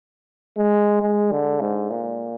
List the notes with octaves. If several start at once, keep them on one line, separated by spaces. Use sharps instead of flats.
G#3
G#3
D3
G#2
A#2